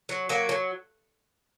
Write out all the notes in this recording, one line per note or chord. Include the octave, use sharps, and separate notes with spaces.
F#3
F#3 A#3
F#3